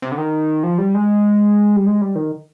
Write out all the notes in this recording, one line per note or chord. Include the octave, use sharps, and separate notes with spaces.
C3
D3
D#3
F3
G3
G#3
G3
G#3
G3
D#3